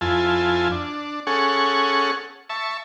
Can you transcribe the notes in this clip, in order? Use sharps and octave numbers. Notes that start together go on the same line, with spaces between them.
F2 E4 F4 G#5 A5
D4
C#4 G#4 A4 F#5 C#6
E5 A5 C#6